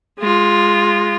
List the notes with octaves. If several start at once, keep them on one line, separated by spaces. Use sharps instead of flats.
G#3 F4